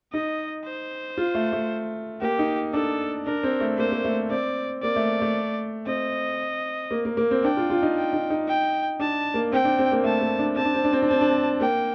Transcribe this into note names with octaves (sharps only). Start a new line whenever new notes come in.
D#4 D#5
C5
F4
A3
A3
A#3 G4
D#4
D4 A4
D4 A#4
C4
A3
A#3 C5
A#3
A3
C4 D5
A#3 D5
A3
A3
C4 D#5
A#3
A#3
A#3
C4
D4 G5
F4
F4
D#4
G5
D#4
D#4
G5
D4 A5
A#3
C4 G5
D4
C4
A#3
A3 A5
A#3
D4
C4 A5
D4
C4
D4
C4
D4
C4 A5
D4
C4
A#3 G5